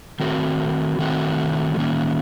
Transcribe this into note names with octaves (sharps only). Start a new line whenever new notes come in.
D#3 A3 C4 F#4
D#3 A3 C4 F#4
D#3 A#3 C#4